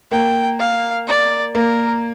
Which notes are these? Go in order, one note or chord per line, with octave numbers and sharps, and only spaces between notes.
A#3 G5
F5
D5
A#3 A#4